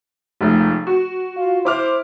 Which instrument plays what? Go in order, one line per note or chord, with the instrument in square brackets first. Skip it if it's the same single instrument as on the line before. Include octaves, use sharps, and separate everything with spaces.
[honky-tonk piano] F1 C#2 A3
F#4
[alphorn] F4
[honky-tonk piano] E4 D6 F6 [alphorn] C5